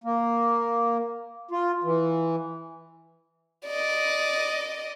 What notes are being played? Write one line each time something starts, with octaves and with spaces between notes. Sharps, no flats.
A#3
F4
E3
D5 D#5